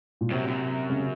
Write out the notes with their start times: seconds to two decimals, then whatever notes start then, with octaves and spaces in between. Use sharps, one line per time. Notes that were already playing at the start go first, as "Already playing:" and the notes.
0.21 A#2
0.31 F#2 C3
0.48 F#2
0.90 C#3